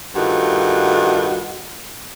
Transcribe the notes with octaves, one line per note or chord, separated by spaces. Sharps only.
G2 D#3 A3 F4 F#4